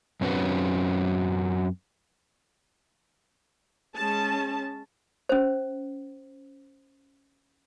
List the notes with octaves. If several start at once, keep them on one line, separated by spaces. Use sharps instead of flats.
F#2 C4 C#4 F#4 B4
G#3 C#4 G#4 A5
C#4 C5